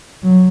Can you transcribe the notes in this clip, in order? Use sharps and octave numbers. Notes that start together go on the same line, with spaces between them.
F#3